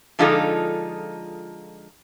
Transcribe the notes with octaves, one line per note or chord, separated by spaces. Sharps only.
D3 F3 G#3 D#4 F4 A4